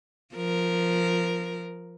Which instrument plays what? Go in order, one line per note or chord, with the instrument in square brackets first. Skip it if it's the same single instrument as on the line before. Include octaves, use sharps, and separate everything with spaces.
[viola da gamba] F3 A#4